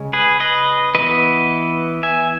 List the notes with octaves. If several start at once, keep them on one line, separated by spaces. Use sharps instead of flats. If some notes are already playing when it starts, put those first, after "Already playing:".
Already playing: C#3 G#3 C#4
G#4 B4
B4 D#5
E3 B3 B4 D#5
E5 G#5